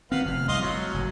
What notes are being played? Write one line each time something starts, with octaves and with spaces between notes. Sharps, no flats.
D#3 C4 B4 F5 F#5
F1 F6
C2 G2 D#5 F5 C6
A2 F#3
F#1